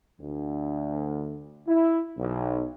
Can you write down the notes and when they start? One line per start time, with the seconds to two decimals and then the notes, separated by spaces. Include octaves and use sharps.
0.20 D2
1.66 E4
2.18 B1